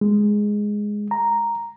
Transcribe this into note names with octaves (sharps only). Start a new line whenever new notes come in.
G#3
A#5